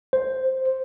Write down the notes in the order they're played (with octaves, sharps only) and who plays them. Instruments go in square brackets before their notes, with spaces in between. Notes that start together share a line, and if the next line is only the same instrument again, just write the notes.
[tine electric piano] C5